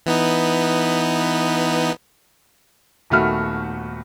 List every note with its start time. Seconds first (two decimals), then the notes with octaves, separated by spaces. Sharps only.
0.06 E3 B3 D#4
3.10 D#1 D#3 A3 B3 F#4 F6